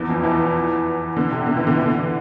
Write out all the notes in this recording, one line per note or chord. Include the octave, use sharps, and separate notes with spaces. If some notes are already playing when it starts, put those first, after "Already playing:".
Already playing: E2 E3
F2 F3
E2 E3
D3
C3
D3
E3
D3
E3
D3